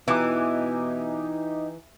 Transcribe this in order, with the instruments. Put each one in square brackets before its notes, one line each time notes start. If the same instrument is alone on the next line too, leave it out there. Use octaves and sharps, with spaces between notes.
[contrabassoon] B2 [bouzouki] E3 [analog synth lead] D#4 [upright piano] G4 G#5 D6